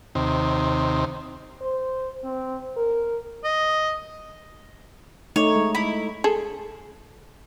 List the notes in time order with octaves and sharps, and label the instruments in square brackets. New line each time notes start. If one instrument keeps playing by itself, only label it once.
[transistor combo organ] D#2 C3
[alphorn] C5
C4
A#4
[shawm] D#5
[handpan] A3 D#4 [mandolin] C#5
[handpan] G#3
[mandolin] E4
[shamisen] G#4 A4